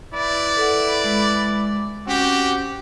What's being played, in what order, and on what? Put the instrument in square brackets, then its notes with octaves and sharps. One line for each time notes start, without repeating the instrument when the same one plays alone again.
[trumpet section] E4 B4 D5
[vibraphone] A4 F#5
G#3 D6
[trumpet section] C4 F#4 G4 [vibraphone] C#4